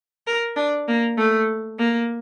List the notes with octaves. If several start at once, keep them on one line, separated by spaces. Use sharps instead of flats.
A#4
D4
A#3
A3
A#3